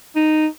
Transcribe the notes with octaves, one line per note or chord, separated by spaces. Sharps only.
D#4